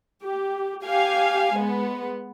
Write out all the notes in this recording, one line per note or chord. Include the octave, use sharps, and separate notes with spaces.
G4
G4 F5 G#5
G#3 B3